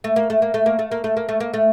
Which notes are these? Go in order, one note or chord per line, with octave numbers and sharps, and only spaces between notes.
A3
A#3
A3
A#3
A3
A#3
A3
A#3
A3
A#3
A3
A#3
A3